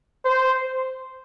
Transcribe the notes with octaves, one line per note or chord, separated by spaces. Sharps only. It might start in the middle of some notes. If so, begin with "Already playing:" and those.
C5